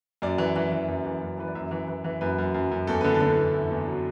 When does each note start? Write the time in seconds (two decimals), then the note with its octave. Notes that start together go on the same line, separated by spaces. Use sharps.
0.22 F#2 D5
0.38 E3
0.56 E3
0.72 E3
0.88 F#2
1.06 E3
1.22 F#2
1.38 E3 B4
1.48 D5
1.55 F#2 E5
1.71 E3
1.88 E3
2.04 E3
2.21 F#2 B4
2.38 F#2
2.54 F#2
2.71 F#2
2.87 E2 A4
3.01 D3 B4
3.14 A4
3.21 D3
3.38 E2
3.54 E2 E4
3.70 E2
3.88 F#3